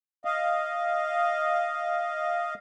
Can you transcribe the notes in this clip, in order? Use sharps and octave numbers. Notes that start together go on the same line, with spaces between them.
D#5 F5